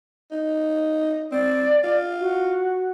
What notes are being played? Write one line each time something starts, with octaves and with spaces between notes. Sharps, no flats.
D#4
C4 D5
F4
F#4